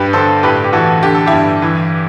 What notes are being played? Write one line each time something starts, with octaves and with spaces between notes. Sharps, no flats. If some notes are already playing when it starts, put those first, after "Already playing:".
Already playing: G2 G4 B4
D3 A4 C5
A2 G4 B4
G4
E3 F#4 A4
D3 G4
A4
E4 G4
G2
E3